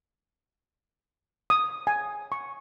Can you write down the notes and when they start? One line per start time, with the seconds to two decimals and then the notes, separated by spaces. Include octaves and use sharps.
1.50 D#6
1.87 G#5
2.32 C#6